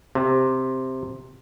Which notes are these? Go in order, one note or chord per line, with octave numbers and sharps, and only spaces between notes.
C3